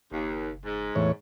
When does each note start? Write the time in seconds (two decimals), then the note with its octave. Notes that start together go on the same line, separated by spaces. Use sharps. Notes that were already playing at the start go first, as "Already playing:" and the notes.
0.12 F#1 D#2
0.64 G#2
0.96 E2 A2 C#5